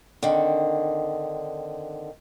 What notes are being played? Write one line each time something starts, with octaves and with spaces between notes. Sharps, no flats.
D3 D#3 C4